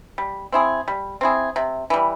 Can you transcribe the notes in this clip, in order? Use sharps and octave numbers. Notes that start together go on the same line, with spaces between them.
G3
C4 E4 G#4
G3
C4 E4 G#4
C3
E3 G3